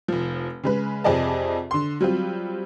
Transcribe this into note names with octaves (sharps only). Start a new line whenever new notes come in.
F1 F3
C#3 G#3 B4
F2 C3 G#4 D5 D#5 A5
D3 C6
F#3 G3 C4 F4